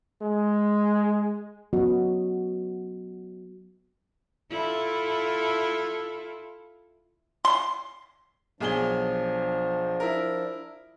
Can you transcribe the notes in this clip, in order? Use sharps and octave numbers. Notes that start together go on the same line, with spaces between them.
G#3
F#3 B3 C#4 F#4 D#5
E4 F4 A4
C6
B1 F3 D4 G#4 G7
E4 A#4